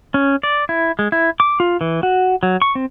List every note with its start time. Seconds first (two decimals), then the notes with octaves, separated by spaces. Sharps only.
0.14 C#4
0.43 D5
0.69 E4
0.99 G#3
1.12 E4
1.40 D6
1.60 F4
1.81 E3
2.03 F#4
2.43 F#3
2.62 C#6
2.75 C4